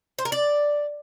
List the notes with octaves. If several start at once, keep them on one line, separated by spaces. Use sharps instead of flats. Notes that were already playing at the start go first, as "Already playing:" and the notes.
C5
A#4
D5